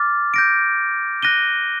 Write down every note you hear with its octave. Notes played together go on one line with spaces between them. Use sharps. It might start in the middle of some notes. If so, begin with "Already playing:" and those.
Already playing: D6 F6 A6
G6 A#6 D7
F#6 A#6 D#7 G7